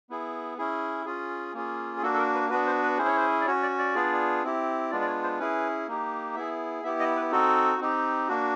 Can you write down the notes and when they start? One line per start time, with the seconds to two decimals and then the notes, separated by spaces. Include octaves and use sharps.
0.10 B3 E4 G#4
0.58 C#4 E4 G#4
1.06 C#4 F4 G#4
1.54 A#3 C#4 F4 G#4
1.97 G#4
2.02 A#3 D4 F#4 A4
2.14 A4
2.18 A#4
2.34 B4
2.50 B3 D4 F#4 B4
2.66 C5
2.83 B4
2.98 C#4 E4 G#4 C5
3.07 C#5
3.17 C5
3.41 D5
3.46 C#4 F#4 C#5
3.63 D5
3.79 D5
3.95 B3 D4 F4 G#4
4.43 C4 E4 G4
4.91 G#3 B3 D4 F4 D5
5.02 D5
5.07 C#5
5.23 C5
5.39 C#4 E4 G#4 B4
5.88 A#3 D#4 G4
6.35 B3 E4 G#4 E5
6.84 B3 E4 G4 E5
7.00 D#5
7.16 B4
7.32 C4 D#4 F#4 A4
7.80 C4 D#4 G4
8.28 A#3 D4 F#4